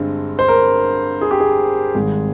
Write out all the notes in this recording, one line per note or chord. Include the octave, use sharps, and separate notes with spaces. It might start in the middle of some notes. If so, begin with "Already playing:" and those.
Already playing: G2 D3 G#3 C4
C5
A#4
G#4
G4
G#4
G#1 G#2 G3 C4